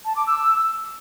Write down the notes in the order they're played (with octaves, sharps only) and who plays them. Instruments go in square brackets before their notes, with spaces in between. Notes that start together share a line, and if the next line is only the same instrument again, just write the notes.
[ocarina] A5
D6
E6